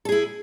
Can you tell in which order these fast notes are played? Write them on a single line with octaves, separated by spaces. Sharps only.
A4 G#4 E4